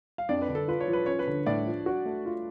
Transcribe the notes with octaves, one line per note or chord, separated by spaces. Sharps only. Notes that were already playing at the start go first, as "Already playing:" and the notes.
F5
F2 D4 D5
B4
D3
A4
F4 B4
C#5
F3
B4
C#4 C#5
B4
D3
A2 D4 D5
F3
F#4
A3
F4